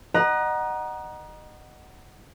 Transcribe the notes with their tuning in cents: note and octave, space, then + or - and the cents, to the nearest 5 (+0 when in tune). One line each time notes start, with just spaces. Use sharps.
D#5 -25 F#5 +15 A#5 +25